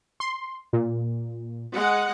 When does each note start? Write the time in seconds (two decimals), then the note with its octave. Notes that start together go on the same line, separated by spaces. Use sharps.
0.20 C6
0.73 A#2
1.76 G#3 F#5